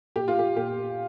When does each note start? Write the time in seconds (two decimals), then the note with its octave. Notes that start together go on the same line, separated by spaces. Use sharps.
0.16 A#2 G4
0.28 F4
0.39 G4
0.56 A#2 G4